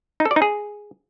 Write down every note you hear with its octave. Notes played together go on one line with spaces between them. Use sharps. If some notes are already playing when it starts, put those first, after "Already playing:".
D#4
A4
D5
D#4
G#4